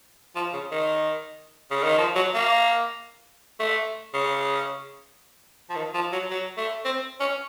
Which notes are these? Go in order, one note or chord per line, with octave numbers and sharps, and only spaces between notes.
F3
C#3
D#3
C#3
D#3
F3
F#3
A#3
A3
C#3
F3
D#3
F3
F#3
F#3
A3
C4
C#4